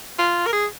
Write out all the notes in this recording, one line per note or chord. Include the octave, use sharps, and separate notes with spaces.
F4
A#4
G#4